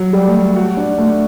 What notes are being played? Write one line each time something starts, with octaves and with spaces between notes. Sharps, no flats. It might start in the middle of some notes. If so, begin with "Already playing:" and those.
Already playing: F#3
G3
A3
F#4
D4
A3